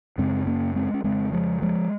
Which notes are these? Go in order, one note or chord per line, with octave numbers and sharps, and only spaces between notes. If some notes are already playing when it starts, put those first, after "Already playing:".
F#2 C#3 G#3 C4
A#3 C#4
G#3 C4
C#4
F2 C#3 G#3 C4
F3 G#3
F3 G#3